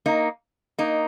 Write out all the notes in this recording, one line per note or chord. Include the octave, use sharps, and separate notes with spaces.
A#3 D#4
A#3 D#4